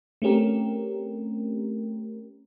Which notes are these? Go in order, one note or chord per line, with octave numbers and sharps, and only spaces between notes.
A3 C4 C#4 G4 A#4